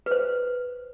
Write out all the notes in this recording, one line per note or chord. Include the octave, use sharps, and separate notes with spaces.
B4
C5